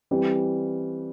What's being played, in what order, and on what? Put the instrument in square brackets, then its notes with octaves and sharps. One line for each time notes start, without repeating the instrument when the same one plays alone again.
[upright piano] E3 G3 C4